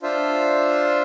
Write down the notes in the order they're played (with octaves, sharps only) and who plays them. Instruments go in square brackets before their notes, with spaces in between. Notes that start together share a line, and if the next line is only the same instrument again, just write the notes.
[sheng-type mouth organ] D4 F4 C5 E5